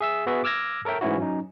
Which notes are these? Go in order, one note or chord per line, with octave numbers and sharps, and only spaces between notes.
G#4 E5 E6
B3 F#4 G#4 B4 E5
D6 E6 F6 G#6 A#6
A4 A#4 C#5 E5 G5
G#2 E3 A3 C#4 E4 F#4
F#3 C#4 D#4